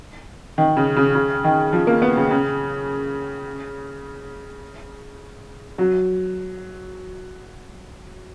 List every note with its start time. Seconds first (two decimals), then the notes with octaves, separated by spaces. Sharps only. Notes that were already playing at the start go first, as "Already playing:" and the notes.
0.58 D#3
0.77 C#3
0.96 C#3
1.15 C#3
1.44 D#3
1.73 F3
1.87 A#3
2.02 B3
2.16 C#3
2.30 C#3
5.78 F#3